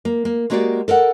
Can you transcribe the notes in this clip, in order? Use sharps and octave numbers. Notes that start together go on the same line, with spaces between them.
A#3
A#3
G#3 A#3 F#4 G4 C#5 D5
A4 A#4 D5 F#5